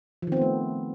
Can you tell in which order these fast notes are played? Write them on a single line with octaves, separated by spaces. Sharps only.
F3 D#3 C4 B3 A3